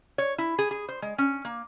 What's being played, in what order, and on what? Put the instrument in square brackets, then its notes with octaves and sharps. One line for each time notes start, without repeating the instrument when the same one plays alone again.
[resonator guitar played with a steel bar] C#5
E4
G#4
G#4
C5
G#3
C#4
A#3